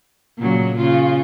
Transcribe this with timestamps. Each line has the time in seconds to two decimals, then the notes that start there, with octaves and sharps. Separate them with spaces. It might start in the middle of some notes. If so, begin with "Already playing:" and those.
0.38 A#2 C#3 F#3
0.78 C#3 F4